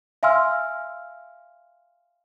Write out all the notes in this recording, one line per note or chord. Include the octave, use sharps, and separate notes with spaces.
E5 F5 G#5 C6 E6 F6